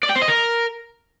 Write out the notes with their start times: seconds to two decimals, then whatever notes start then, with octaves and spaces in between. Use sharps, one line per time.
0.03 D5
0.10 G5
0.16 C5
0.22 D#5
0.28 A#4